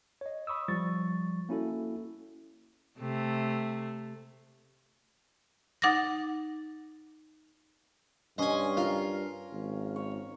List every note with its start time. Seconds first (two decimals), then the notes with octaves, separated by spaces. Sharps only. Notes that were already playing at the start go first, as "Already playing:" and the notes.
0.21 C#5 D#5
0.47 B5 C#6 D#6 E6
0.68 F3 G3 C#6 A6
1.49 A#3 C#4 E4 F#4 A4
2.99 C3 A3
5.82 D#4 F#5 D6 A6 A#6
8.38 G2 C#4 D#5 G#5 C6
8.77 F4 A#4 F5
9.53 G#1
9.96 C#5